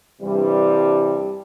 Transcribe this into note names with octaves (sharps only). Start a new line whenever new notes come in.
G2 C3 E3 G3